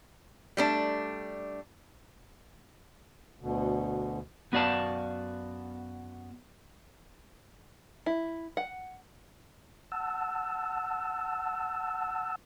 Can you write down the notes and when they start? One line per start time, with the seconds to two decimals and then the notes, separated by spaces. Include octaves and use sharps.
0.57 G3 A3 D4
3.41 D2 B2 D3
4.52 F#2 B3 F#4 D5 F5 A5
8.06 E4
8.57 F#5
9.92 F#5 A5 E6